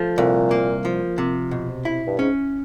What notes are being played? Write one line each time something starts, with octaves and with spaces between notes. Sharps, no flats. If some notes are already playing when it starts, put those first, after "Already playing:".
Already playing: F3 A3
C2 A#2
A#3
F3
C3
B2
E4
G2
G#2 C#4